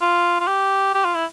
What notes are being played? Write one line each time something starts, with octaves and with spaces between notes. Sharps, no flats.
F4
F4
G4
G4
F4
E4